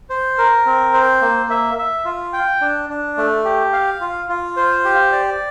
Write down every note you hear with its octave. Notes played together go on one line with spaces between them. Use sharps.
C5
A#4
C4
C5
A#3
E5
E5
F4
G5
D4
D4
A3
G4
F5
F4
F4
C5
G4
D5